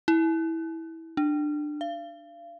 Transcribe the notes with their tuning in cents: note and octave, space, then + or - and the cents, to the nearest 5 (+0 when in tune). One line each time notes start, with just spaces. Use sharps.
E4 -15
D4 +20
F5 -35